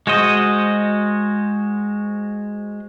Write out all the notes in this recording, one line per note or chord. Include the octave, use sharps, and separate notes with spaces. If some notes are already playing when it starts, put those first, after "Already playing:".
G#3 F#4 C5 D#5